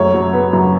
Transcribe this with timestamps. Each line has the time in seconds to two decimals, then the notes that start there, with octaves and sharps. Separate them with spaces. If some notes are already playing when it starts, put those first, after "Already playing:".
Already playing: F#2 A3 C#5
0.14 F#3
0.33 B3
0.53 F#2